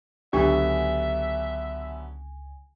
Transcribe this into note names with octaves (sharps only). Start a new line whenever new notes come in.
C#2 D3 F#3 B3 D4 G4 E5 G#5